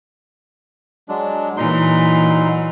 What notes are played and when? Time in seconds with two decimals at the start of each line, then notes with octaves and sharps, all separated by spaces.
1.09 F#3 G#3 D4
1.57 A#2 E3 F#3 D#4 C6